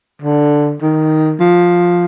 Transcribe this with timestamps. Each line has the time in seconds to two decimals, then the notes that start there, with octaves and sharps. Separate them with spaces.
0.22 D3
0.82 D#3
1.40 F3